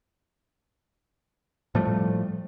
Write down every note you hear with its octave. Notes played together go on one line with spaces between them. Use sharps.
A2 F3 G3 A3